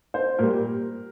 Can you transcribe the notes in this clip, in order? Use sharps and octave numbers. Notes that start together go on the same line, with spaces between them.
C5
A#2 G3 A#4